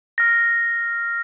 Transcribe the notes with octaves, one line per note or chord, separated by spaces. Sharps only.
F6 A#6